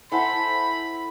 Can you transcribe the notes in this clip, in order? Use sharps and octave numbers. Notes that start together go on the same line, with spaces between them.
E4 A4 C5 F#5 G#5 B5